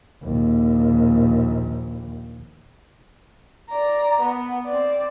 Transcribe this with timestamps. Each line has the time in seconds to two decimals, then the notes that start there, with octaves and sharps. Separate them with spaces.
0.24 A#1 D#2
3.70 D5 A#5
4.20 B3
4.66 C4 D5